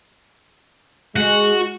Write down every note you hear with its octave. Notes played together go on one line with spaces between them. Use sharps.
G#3 F#4